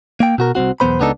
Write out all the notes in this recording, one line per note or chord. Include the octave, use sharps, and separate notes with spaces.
A#3 G5
B2 F#4 A#4
C2 B2 C4 F#4
B1 E2 A#2 B3 C5 B5
C#2 B3 D4 D#4 A4